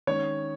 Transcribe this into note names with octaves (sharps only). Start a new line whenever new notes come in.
D#3 G#3 C#4 C#5